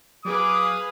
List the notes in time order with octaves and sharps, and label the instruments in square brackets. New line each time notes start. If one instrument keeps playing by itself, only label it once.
[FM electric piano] F#3 [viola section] G#4 B4 F5 [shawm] D6 [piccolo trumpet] D#6